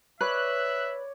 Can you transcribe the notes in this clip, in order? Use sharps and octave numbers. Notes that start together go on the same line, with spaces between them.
B4 C#5 D5 E5 F#6